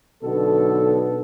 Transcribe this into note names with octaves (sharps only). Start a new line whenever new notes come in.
B1 B2 D3 B3 A4